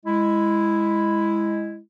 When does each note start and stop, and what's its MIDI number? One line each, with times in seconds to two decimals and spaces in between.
0.06 1.78 56
0.06 1.78 64